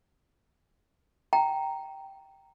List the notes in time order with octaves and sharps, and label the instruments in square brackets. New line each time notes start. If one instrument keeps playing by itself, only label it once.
[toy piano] G5 A#5